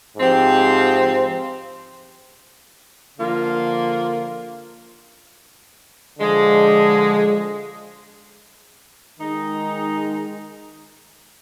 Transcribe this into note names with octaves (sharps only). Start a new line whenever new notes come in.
G#2 F3 C4 G4
D3 F3 A#3 F4
D3 F3 G#3
D#3 G#3 D#4